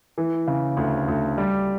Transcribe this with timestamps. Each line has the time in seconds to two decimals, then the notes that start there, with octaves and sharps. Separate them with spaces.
0.18 E3
0.47 C#3
0.77 D2
1.08 D2
1.38 G3